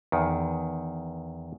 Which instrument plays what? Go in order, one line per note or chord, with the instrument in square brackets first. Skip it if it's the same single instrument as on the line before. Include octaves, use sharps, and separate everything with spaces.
[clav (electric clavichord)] E2 D#3